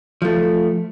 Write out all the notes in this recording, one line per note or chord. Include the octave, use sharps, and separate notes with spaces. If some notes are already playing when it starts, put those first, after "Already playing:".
F3 A3